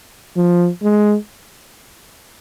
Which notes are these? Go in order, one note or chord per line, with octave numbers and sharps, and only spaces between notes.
F3
G#3